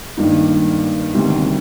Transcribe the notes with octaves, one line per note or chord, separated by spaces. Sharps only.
G2 D#3 A#3 D#4
D2 C3 D#3 G3